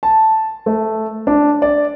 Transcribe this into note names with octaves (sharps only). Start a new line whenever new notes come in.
A5
A3
D4
D5